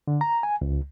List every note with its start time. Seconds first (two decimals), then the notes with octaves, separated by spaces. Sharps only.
0.08 D3
0.21 A#5
0.43 G#5
0.62 C#2